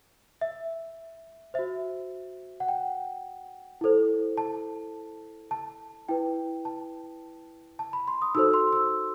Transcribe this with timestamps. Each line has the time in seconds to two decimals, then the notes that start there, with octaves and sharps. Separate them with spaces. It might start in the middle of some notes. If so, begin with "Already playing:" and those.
0.41 E5
1.54 F#4 C5 E5
2.60 F#5
2.68 G5
3.81 E4 A4 C5
4.37 A5
5.51 A5
6.08 E4 B4 G5
6.65 A5
7.79 A5
7.93 B5
8.07 C6
8.22 D#6
8.35 D#4 F#4 A4 C5 E6
8.54 C6
8.73 E6